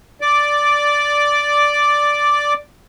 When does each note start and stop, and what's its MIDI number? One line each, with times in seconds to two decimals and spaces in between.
0.21 2.54 74
0.21 2.54 86